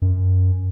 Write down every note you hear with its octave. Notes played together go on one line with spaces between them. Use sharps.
F#2